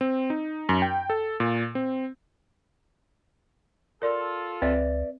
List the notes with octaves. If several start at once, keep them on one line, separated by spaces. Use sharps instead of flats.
C4
D#4
F#2
G5
A4
A#2
C4
F4 A4 A#4 D5
C#2 C4 B4 D5 E5